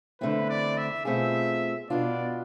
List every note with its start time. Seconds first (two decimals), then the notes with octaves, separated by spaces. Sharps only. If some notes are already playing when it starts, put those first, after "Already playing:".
0.21 E2 D3 A3 C4 E4 B4
0.50 D5
0.78 E5
1.05 B2 A3 C4 F4 G#4 E5
1.89 B2 B3 D4 F4 D5